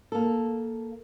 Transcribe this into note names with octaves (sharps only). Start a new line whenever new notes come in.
A#3 A4